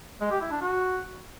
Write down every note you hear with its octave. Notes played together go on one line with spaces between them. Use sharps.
G#3
G4
E4
D4
F#4